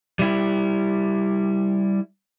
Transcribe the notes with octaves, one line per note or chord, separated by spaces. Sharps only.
G3 E4